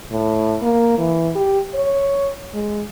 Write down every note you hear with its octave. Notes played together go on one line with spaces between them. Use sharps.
A2
A#3
E3
G4
C#5
G#3